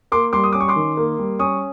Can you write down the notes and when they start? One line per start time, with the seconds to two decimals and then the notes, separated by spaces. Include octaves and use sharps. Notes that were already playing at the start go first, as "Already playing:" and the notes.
0.12 A#3 C6 D6
0.33 G3 C6 D6
0.44 D#6
0.53 C#4 D6
0.60 C#6
0.68 C6 D6
0.76 D#3
0.97 A#3
1.19 G3
1.39 C#4 C#6 D#6